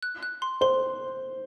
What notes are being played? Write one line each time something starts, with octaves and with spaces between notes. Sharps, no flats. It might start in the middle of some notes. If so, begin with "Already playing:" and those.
F#6
F#6
C6
C5 C6